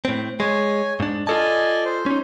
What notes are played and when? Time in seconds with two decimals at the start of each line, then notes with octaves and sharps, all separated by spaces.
0.05 A2 C4
0.40 G#3 C#5 G#5
1.00 G#2 D4
1.27 F4 A4 D5 D#5 G#5 A5
1.85 C5
2.06 C#4 D#4